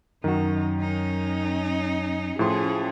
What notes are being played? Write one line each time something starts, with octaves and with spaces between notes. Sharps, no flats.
F#2 D#3 D#4 F#4
C#4 D#4
A2 F3 C#4 G#4 C6